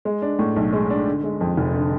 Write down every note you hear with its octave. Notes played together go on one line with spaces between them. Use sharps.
G#3
D4
A2
B1
G#3
D4
D3
G#3
F2
F1
D3